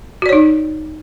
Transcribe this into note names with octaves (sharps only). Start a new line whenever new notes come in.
D#4 F#4 C#5 D5